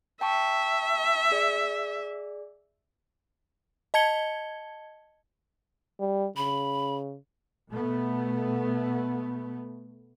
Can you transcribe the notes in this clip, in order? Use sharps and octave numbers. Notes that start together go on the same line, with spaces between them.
E5 G5 A5 C#6
G#4 D5
D#5 A5 G#6 C#7 G7
G3
C#3 B5
B2 A3 B3